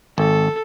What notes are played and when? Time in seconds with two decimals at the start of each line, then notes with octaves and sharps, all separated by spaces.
0.18 G#1 A4